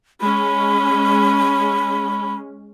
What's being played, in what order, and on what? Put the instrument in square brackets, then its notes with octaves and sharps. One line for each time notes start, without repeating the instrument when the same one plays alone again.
[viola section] G#3 C#4 [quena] B5